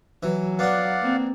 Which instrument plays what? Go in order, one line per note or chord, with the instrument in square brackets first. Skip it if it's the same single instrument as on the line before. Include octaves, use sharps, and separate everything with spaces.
[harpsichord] E3 [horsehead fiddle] F#3
[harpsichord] B3 D4 [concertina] D5 F5 F#5
[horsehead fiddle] A#3 C4